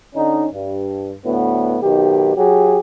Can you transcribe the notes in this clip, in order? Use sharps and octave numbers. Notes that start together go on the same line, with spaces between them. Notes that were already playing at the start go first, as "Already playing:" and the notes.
D3 C#4 D#4
G2
D2 A2 B3
B1 D#3 G4
F#3 G4 G#4